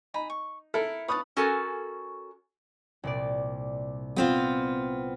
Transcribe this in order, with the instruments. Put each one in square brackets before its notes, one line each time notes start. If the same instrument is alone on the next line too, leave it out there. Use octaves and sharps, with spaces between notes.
[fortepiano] D#4 [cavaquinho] G#5 A#5 B5
[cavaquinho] C#6
[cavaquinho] E4 A#4 [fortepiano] A4
[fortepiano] B4 B5 D#6 [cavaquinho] C#5 F5 A5
[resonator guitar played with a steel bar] C#4 F#4 A4 A#4 G#5
[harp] C2 A#2 D5
[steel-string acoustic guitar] B3 C4 F4